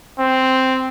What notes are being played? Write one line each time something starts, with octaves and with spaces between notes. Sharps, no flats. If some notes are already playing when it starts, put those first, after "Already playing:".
C4